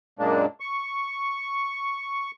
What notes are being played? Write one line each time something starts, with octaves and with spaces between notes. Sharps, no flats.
F#2 A#2 G#3 A#3 D4
C#6